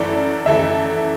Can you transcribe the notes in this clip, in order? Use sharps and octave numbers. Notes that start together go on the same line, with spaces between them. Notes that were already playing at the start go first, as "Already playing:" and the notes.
Already playing: F#2 E3 A3 E4 A4 D5
F#2 E3 A3 E4 A4 E5